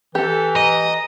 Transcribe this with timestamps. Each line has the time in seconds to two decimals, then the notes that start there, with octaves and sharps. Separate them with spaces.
0.15 E3 G4 A4
0.56 D#5 A#5